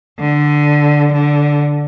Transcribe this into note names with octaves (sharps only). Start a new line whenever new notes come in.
D3
D3